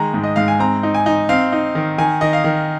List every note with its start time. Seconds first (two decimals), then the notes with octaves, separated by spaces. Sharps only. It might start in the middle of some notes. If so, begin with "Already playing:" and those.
Already playing: D#3 G#3 A#5
0.14 G#2
0.24 D#5
0.36 G#2 F5
0.48 G#5
0.59 C4 A#5
0.83 D#4
0.94 G#5
1.06 D#4
1.29 C4 F5
1.52 D#4
1.75 D#3
1.98 D#3 G#5
2.21 D#3 D#5
2.33 F5
2.44 D#3